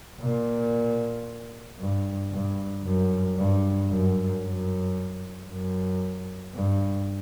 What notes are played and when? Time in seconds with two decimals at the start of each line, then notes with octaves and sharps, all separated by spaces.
0.21 A#2
1.79 G2
2.32 G2
2.84 F#2
3.38 G2
3.90 F#2
4.43 F#2
5.49 F#2
6.55 G2